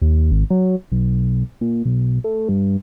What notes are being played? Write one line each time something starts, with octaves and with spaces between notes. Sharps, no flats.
D#2
G#1
F#3
B1
A#2
B1
A3
G2